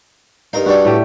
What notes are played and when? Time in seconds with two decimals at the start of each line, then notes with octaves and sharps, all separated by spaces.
0.53 G2 D#4 A#4 F5
0.66 G2 G3 D4 F#4 A4
0.85 A2 A3 G4